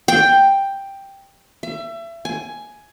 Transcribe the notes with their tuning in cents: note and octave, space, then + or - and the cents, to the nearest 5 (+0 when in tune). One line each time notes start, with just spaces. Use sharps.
G5 +5
E5 +30
G#5 +10